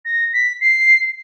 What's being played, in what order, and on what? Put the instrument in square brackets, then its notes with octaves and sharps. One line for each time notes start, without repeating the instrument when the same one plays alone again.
[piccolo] A#6
B6
C7